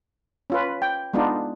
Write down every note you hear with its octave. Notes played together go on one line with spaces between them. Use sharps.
C#4 F4 B4
G5
G#3 B3 D4 D#4 F4